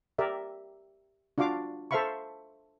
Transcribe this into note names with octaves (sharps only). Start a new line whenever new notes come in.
G4 A#4 D5 E5
D4 F4 F#4 F5 D6
A4 C5 E5 F5 B5 C#6